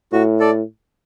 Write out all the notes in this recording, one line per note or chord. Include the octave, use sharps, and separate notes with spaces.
A2 F#4
A4 D5